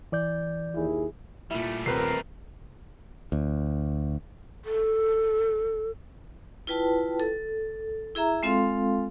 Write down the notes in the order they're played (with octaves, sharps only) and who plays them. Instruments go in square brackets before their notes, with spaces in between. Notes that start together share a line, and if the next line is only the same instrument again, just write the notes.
[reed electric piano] E3 D5 G6
[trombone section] D#2 E4 G#4
[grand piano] A#2 E4 [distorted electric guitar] G3 A3
[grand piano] D#1 [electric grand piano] C4 B4 C7 [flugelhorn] A#4
[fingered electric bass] D2
[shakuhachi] A4
[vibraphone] E4 F4 B4 G5 A5
A4
E4 G#4 E5 A#5
G#3 C4 F4 A4 F5 C6